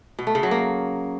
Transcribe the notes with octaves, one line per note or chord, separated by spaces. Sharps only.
B2
A3
C#3
F#3
A#3